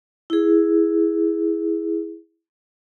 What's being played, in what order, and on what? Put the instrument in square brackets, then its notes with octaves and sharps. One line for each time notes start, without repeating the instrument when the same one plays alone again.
[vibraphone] E4 G#4